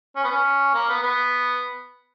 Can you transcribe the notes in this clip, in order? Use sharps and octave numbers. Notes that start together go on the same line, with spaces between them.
C#4
B3
C#4
A#3
B3
B3